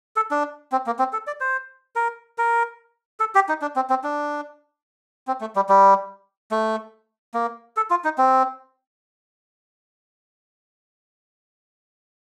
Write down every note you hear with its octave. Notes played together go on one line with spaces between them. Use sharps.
A4
D4
C4
A#3
C4
A4
D5
C5
A#4
A#4
A4
G4
D#4
D4
C4
C4
D4
C4
A3
G3
G3
A3
A#3
A4
F4
D#4
C4